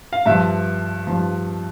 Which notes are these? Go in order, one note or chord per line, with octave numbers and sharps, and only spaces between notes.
F5
G2 F3 E5
G2 F3